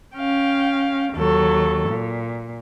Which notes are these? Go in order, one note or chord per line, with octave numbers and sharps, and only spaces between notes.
C#4 F5 G5
D#2 F#3 A4
A#2